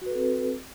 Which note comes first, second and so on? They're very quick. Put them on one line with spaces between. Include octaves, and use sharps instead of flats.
F#4 B4 A4 C4